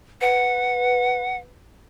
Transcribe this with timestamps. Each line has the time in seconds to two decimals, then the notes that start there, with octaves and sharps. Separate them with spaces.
0.21 B4 F#5